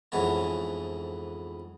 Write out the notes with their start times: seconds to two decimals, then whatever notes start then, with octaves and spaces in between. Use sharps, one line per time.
0.12 F2 G#2 E3 B3 C#5 A5